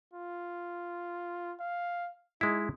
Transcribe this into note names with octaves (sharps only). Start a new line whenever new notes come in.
F4
F5
G#3 D#4 E4